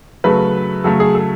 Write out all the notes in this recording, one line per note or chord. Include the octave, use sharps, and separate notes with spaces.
C#3 F#3 A3 B4
C#3 F#3 A3 A4
G#4
A4